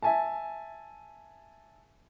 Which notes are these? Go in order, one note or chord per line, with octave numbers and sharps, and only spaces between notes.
E5 G#5 A5